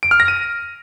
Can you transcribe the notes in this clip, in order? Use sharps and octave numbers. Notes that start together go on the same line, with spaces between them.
D7
F6
A#6
D#7